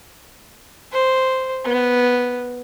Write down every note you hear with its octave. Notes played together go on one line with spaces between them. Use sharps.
C5
B3